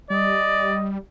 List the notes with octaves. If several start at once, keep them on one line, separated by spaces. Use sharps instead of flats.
G3 D5 D#5